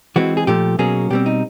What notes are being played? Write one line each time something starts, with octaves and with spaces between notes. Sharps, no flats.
E3 G#3 C4 F#4
G#4
A#2 F3 A3 G4
B2 F#3 A#3 C#4 G#4
B2 G3 C4 G4
D#4